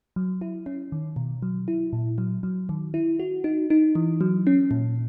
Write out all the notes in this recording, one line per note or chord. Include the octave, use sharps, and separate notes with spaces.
F#3
E4
C#4
D#3
B2
F#3
E4
A#2
F#3
F#3
D#3
E4
F#4
D#4
D#4
E3
F#3
C#4
A#2